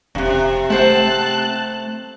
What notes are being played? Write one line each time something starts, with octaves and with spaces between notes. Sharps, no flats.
F1 F#2 C3
A3 C4 C5 F#5 A5 F#6